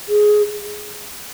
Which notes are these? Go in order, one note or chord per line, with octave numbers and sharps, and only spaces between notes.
G#4